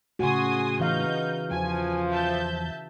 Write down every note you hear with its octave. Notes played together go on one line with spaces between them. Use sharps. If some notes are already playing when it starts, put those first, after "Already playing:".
A2 C#3 F#4 G#5 C6 D#6
E3 D#4 F5 G6
E2 F3 G#5
E5 A5 G6